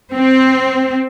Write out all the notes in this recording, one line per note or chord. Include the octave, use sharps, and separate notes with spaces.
C4